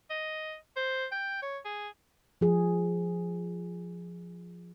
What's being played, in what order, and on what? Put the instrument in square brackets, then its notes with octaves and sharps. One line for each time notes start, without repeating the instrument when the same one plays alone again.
[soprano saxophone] D#5
C5
G5
C#5
G#4
[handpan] F3 G#4